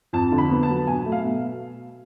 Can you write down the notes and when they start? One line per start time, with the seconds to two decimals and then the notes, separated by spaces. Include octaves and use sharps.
0.13 F2 A5
0.32 D3
0.38 B5
0.50 B3
0.63 A5
0.69 F#3
0.87 B2 G#5
1.05 A3
1.12 F5
1.24 B2